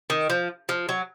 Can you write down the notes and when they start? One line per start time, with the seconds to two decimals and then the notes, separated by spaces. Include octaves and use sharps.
0.10 D#3
0.30 F3
0.69 F3
0.89 F#3